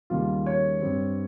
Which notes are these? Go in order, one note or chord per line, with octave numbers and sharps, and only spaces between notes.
D#2 C#3 G3 A#3 F4
C#5
G2 G3 C4